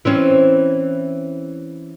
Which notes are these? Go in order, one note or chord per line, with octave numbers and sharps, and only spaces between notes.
E3 C4 C#4